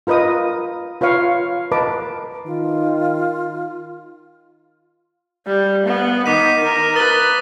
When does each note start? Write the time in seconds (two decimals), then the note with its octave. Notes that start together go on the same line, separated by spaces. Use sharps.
0.07 F4 A#4 B4 D#5 D#6
1.01 F4 B4 C#5 F5 C#6
1.72 A#4 B4 D#5 A5 D6
2.46 D#3 F4
5.46 G3
5.85 B3
6.26 D#3 D6 B6 D#7
6.63 A#4
6.96 B4 D#6 A6 G7